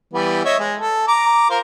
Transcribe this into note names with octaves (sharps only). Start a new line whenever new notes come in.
E3 G3 B3
C#5 D#5 E5
G#3
A4
A#5 D6
F4 A#4 C5